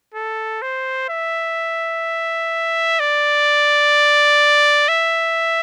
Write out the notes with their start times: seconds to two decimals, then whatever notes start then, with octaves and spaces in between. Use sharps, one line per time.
0.14 A4
0.62 C5
1.09 E5
3.00 D5
4.88 E5